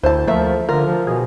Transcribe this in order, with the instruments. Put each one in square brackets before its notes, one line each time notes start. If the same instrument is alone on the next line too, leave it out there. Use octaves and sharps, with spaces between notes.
[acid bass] D2 [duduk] E4 [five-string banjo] C5 A5
[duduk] F3 [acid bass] A3 [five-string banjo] A#3 E5
[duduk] D3 [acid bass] F4 [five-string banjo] A#4
[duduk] F3
[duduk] B2 [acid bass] G#4